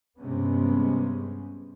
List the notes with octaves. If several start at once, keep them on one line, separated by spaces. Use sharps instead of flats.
G2 C3 G#3 B3 C#4